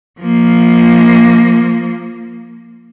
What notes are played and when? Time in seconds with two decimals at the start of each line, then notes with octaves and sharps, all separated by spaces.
0.21 F3 A#3